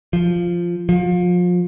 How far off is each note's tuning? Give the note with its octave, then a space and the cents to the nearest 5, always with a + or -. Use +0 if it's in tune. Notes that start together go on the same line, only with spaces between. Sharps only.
F3 -5
F3 +30